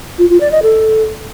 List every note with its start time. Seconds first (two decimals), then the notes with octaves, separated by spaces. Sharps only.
0.19 F4
0.30 F4
0.41 D5
0.52 D#5
0.63 A4